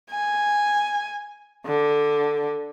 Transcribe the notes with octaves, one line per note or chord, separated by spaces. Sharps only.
G#5
D3